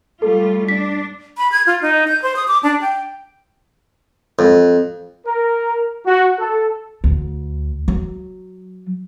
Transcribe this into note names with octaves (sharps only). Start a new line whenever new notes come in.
G3 A3 F4 A4
D4 B6
B5
G#6
F4
D#4
G6
C5
D#6
D6
D4
G5
F2
A#4
F#4
A4
D2
F#3